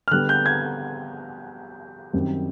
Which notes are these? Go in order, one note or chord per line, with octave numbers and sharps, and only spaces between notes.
F6
D3 G3 B3 F#6
G6
G#6
F#2 D#3 G3 C4